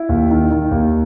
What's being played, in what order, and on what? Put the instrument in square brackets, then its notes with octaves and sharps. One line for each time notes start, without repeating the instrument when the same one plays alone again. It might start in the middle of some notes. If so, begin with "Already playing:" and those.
Already playing: [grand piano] E4
D#2
D#3
D#3
D#2